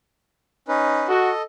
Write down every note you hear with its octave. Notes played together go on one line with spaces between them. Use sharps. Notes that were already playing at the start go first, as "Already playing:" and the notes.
C#4 D#4 B4
F#4 A4 D#5